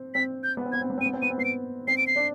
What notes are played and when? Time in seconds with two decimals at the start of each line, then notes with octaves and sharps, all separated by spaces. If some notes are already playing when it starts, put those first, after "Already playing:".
Already playing: C4
0.14 C4 B6
0.43 G6
0.57 B3
0.65 C4
0.72 B3 G#6
0.81 C4
0.90 B3
0.98 C4
1.01 D#7
1.06 B3
1.13 C4
1.22 B3 D#7
1.30 C4
1.38 B3 C7
1.45 D7
1.87 C4 C7
1.97 D7
2.07 C7
2.16 D4